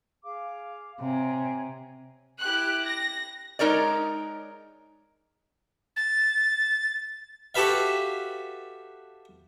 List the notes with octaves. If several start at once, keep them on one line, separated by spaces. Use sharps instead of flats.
G#4 F5 D6
C3 C#5 G#5 A#5
E4 G4 F#6
A#6
G#3 D#4 A#4 C#5 D5
A6
F#4 G4 A4 B4 E5 F5